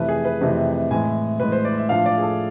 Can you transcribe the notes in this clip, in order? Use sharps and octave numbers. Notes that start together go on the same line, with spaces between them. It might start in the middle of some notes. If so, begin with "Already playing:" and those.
Already playing: F2 C3 E3 A3 B4
G#4
B4
F2 C3 E3 A3
A2 E3 G#3 G#5
A2 E3 G#3 B4
C5
D5
E5
A2 F3 A3 D4 F5
D5
G#4
A4